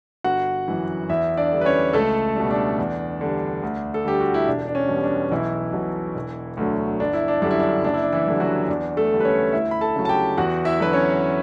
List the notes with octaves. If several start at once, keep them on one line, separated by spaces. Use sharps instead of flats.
G1 F#4 F#5
F#2 E3
E2 E4 E5
D4 D5
D3 G3
B4
C#4 C#5
C#2 A3 A4
B2 G3
D4
E2
D3 G3
D2
A4
D3 G3 G4
F#4
E4
E1 D4
D4
C#4
E2 B2 G3
D4
B1 E3 E4
B2 F#3
E1
D2 D3 F#3
G1 D4
E4
D4
F#2 D3 G3 D4
E4
D4
F#1 D4
E4
D4
E3 E4
F#2 D3 G3
F#3 F#4
E2 D4
A3 A4
D3 G3
B4
C#4 C#5
D2 E4 E5
B5
A4 A5
C#3 F#3
A5
G4 G5
E2 F#4 F#5
E4 E5
D3 F#3 B4
C#4 C#5